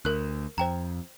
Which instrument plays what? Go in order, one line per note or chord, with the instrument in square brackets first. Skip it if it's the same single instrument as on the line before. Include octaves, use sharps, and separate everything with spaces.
[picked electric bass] D2 [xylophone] A#4 F#6
[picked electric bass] F2 [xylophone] C5 G5 A#5